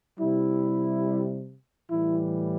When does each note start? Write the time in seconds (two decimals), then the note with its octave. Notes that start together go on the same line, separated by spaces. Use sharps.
0.19 C3 G3 E4
1.89 A2 E3 G3 E4